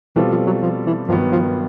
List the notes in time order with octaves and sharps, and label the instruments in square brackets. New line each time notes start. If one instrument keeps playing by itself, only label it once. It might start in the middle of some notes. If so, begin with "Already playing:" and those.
[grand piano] B2 G3 C4 F4 A4 [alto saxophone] E3
[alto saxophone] F3
F#3
F3
E3
[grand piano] G2 D#3 F#3 B3 [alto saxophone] F3
[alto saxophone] F3